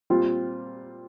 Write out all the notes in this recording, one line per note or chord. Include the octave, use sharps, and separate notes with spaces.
A#2 G3 C4 F4